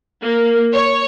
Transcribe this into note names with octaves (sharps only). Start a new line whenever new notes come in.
A#3
C#5